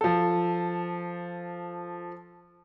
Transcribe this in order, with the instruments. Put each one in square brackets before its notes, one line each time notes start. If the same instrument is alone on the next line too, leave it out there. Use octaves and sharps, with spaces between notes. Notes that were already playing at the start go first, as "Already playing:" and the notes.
[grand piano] F3 A4